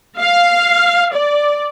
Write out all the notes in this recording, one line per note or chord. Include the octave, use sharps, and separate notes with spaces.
F5
D5